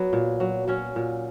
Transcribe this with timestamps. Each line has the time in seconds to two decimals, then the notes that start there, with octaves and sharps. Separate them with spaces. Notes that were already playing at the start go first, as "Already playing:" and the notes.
Already playing: F#3 B3
0.13 A#2
0.40 F#3
0.68 F#3 C#4
0.96 A#2